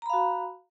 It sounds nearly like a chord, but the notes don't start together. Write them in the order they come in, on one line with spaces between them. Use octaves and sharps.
A#5 B5 F5 F#4